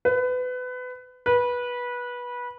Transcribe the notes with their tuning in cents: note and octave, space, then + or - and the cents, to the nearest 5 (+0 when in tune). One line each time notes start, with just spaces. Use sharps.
B4 +25
B4 -20